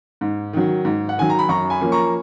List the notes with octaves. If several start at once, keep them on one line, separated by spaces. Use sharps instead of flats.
G#2
D#3 F#3
G#2
F#5
D#3 F#3 G#5
A#5
B5
F#2 A#5 C#6
G#5 B5
F3 A#3 C#4
A#5 C#6